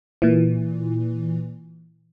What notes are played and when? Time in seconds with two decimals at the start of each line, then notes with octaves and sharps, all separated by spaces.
0.22 A#2 E3